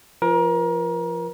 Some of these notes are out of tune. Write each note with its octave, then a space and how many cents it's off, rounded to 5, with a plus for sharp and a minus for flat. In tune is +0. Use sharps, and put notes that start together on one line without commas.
F3 -25 A#4 +30